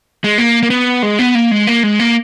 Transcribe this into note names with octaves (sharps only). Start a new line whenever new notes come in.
G#3
A#3
A#3
B3
G#3
B3
A#3
G#3
A#3
G#3
A#3